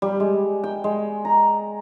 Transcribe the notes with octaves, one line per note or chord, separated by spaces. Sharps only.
G3
G#3
G5
G#3
A#5